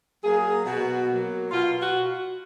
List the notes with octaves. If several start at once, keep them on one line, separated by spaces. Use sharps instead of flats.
F#3 A#3 G#4
B2 F#4
F#3 A#3
B2 F4
F#4